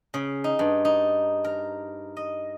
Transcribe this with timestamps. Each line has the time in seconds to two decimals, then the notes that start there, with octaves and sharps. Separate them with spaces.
0.14 C#3
0.44 D#4
0.59 G2
0.85 D#4
1.44 A#4
2.17 D#5